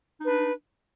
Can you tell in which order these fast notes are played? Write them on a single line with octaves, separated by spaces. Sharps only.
D#4 B4 D4